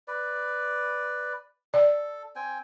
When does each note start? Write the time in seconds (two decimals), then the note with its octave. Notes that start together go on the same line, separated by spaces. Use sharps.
0.08 B4 D5
1.74 A4 D5
2.36 C4 G5 G#5